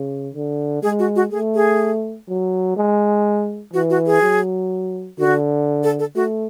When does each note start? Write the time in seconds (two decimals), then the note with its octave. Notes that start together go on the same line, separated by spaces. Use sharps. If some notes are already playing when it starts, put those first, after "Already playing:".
Already playing: C#3
0.34 D3
0.83 G#3 G#4
0.99 F#4
1.16 F#4
1.31 A3 G#4
1.55 G#4
2.28 F#3
2.76 G#3
3.73 E3 F#4
3.90 F#4
4.06 G#4
4.22 F#3
5.18 D3 F#4
5.83 A4
5.99 A4
6.15 A3 F#4